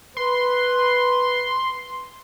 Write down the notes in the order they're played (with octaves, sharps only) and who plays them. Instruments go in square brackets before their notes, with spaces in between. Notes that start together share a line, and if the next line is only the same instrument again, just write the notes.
[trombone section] B4 [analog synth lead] C6